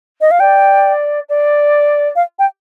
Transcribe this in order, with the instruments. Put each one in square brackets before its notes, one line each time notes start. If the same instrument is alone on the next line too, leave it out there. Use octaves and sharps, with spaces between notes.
[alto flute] D#5
F5
[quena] D5 [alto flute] G5
[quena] D5
[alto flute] F5
G5